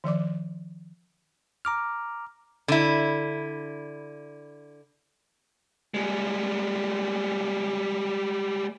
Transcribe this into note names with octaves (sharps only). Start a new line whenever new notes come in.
D#3 F3 D5 D6
A#5 D6 F6
D3 E4
G3 G#3